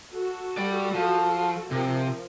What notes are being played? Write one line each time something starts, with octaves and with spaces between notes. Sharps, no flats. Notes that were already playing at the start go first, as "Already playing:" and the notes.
F#4 A4
G3 D5
F3
C3 F3 A#4